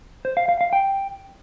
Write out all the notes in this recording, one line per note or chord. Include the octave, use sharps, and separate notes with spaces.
C5
F5
F5
F5
G5